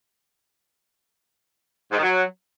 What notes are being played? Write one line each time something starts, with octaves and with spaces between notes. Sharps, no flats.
G#2
D#3
F#3